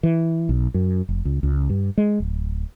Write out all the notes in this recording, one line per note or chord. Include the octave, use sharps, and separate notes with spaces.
E3
B1
F#2
F1
C#2
C#2
G2
G#3
D1